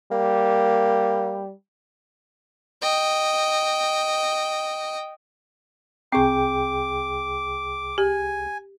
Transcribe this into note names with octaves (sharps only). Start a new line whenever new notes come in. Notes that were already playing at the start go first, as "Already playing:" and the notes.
G3 A#3
D#5 G5
C2 C4 G#4 G5 C#6 D6
G4 G#5